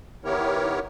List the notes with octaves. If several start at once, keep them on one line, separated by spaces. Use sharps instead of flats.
D#3 B3 E4 G4 A#4 C#5